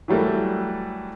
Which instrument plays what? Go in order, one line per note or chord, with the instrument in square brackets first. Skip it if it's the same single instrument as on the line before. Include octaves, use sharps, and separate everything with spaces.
[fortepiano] E3 F#3 G3 A3 A#4